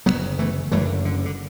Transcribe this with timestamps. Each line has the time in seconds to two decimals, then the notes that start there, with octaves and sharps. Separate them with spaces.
0.06 F#1 F#2 D3 F#3 B3
0.39 E3 A3
0.72 F#1 F#2 D3 E3 A3
1.05 D3
1.25 D3